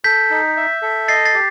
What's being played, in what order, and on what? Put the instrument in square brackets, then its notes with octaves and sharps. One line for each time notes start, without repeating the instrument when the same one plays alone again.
[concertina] A4 [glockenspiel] G6 B6
[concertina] D#4
E5
A4
[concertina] D#5 [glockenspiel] A6 C7
[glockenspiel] A6 C7
[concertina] G4